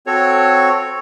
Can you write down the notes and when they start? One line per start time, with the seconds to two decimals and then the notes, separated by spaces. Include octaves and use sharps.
0.07 C4 F#4 A4 C#5